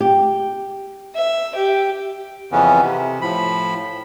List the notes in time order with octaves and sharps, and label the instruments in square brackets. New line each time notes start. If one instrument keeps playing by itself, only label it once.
[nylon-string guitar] G4
[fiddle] E5
G4
[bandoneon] F2 C#3 E3 B3 C#4
C3
A2 F3 B5